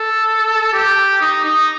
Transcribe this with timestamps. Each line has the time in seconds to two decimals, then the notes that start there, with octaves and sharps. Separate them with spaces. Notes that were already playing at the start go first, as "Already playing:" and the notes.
Already playing: A4
0.73 G4
1.21 D#4
1.45 D#4